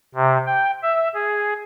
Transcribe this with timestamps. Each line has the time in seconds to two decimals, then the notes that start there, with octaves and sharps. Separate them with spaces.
0.15 C3
0.46 G5
0.83 E5
1.15 G#4